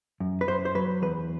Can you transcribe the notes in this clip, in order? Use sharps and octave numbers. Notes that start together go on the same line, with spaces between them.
F#2
B4
F#2 C5
C5
F#3 B4
E2 B4